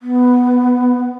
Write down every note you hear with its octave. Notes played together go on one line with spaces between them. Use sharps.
B3